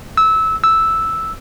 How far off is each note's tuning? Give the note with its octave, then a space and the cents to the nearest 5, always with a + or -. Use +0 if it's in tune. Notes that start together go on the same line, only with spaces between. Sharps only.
E6 -20
E6 -5